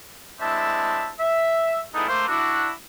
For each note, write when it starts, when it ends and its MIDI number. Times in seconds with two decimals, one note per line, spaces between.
0.41 1.11 56
0.41 1.11 60
0.41 1.11 62
0.41 1.11 64
0.41 1.11 76
0.41 1.11 81
1.20 1.83 76
1.95 2.08 55
1.95 2.08 59
1.95 2.08 63
1.95 2.08 64
1.95 2.08 68
1.95 2.08 69
2.08 2.28 57
2.08 2.28 58
2.08 2.28 72
2.28 2.71 62
2.28 2.71 64
2.28 2.71 66